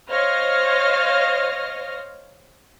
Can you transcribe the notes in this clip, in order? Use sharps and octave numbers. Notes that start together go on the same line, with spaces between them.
C5 C#5 D#5 F5 F6 A#6